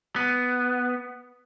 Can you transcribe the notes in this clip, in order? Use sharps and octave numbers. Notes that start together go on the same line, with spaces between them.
B3